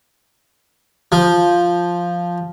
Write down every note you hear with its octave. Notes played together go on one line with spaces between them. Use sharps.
F3